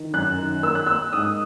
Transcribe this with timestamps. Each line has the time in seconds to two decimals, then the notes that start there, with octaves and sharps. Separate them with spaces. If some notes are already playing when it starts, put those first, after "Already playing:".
Already playing: D#3
0.13 F#2 F#6
0.38 D#3
0.63 A#3 E6
0.75 F#6
0.87 A#3 E6
1.13 G#2 D#6